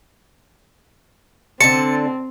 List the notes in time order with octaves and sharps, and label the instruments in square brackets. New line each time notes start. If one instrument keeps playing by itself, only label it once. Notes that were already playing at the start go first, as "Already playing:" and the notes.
[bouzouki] D3 A5 [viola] C4 [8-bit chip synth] C#7